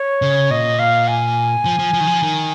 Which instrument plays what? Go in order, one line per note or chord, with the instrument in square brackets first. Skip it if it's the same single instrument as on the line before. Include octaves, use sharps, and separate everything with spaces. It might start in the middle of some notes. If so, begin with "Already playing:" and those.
Already playing: [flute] C#5
[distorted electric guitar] C#3
[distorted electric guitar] A#2 [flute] D#5
[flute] F5
G#5
[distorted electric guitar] F3
F3
F3
D#3
F3
D#3